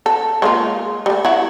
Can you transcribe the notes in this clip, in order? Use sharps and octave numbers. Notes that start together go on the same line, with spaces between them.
A4
G#3 A#3 F4
G3 A3
E4 F#4